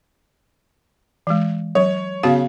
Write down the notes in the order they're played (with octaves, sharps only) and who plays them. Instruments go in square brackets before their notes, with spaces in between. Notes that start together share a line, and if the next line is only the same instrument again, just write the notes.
[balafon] E3 G#3
[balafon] F#3 [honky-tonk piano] C#5
[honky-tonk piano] C#3 [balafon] B3 F#4 F5